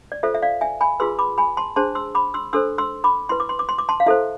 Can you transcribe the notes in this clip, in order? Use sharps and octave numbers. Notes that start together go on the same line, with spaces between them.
D5
F4 A4 C5 E5
E5
D5 F5
E5 G#5
G#5 B5
F4 G#4 B4 C6 E6
B5 D6
G#5 B5
A5 C6
D4 G#4 C5 A5 C6
C6 E6
B5 D6
C6 E6
D4 A4 C5 C6 E6
C6 E6
B5 D6
E4 B4 C6
D6
C6
D6
C6
D6
A5 C6
F5
E4 A4 C5 E5